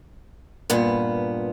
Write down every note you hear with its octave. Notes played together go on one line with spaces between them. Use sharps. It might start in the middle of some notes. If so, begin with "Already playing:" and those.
G2 A#2 B3